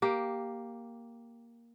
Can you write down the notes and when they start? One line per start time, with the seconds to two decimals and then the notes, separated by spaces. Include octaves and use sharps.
0.02 A#3 G4